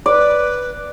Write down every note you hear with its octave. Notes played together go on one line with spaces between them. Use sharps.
B4 D5